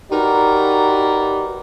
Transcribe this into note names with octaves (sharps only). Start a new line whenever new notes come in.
D#4 F#4 G4 A#4 B4 D5